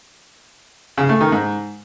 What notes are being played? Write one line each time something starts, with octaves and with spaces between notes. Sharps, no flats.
C#3
A3
D#3
G#2